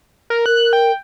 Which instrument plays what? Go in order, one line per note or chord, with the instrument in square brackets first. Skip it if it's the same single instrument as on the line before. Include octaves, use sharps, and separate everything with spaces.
[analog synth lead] A#4
[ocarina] A#4 [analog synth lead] F#6
[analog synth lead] G5